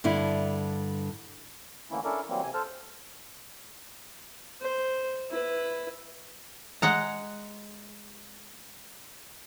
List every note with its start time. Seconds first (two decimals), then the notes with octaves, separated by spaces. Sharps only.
0.04 G2 D3 E4
1.91 D3 E3 A3 A#3 C#4 E4
2.04 C#4 D4 E4 A4 A#4 D5
2.29 E3 F#3 G3 A#3 C4
2.43 C3 G#5
2.54 A4 C5 A5 F6
4.61 C5
5.31 E4 B4
6.82 G#3 F#5 A#5